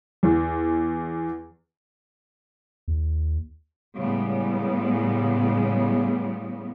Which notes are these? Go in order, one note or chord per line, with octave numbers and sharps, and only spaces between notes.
E2
D#2
A2 C#3 G3 G#3 B3